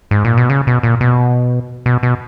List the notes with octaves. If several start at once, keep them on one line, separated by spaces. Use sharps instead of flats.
G#2
A#2
B2
C#3
B2
A#2
B2
B2
B2